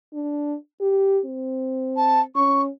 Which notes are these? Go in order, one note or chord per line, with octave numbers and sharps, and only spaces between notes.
D4
G4
C4
A5
C#4 C#6